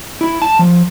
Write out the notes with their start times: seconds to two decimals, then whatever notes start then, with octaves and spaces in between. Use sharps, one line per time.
0.21 E4
0.42 A5
0.59 F3